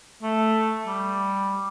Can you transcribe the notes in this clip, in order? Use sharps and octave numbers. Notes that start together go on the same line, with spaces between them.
A3
G3